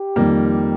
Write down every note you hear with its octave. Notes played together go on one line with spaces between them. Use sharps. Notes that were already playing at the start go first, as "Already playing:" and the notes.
Already playing: G4
F2 D#3 G3 A#3